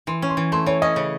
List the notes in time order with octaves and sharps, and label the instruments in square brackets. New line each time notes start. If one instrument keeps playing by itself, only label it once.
[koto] E3 [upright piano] C6
[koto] C#4
[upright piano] C6
[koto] E3
[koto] A3 [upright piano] C6
[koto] E3 [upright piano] C#5
[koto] C#4 [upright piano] D#5
[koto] C#3